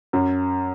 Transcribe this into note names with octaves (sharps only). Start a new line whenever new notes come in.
F#2